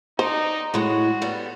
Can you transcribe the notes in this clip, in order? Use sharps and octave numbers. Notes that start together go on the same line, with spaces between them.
D#4 C5 D5
A2 G#3 F#4
G3 B3 A4